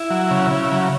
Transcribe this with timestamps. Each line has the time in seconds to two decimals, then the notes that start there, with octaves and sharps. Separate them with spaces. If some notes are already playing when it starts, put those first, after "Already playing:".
Already playing: E4
0.10 F#3
0.31 C#3
0.51 C#3
0.71 F#3